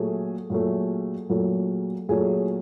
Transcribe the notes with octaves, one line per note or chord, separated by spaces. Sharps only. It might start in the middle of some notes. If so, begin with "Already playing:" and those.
Already playing: A#2 F#3 A3 G#4
A#2 F#3 A3
A#2 F#3 A3
A#2 F#3 A3 G#4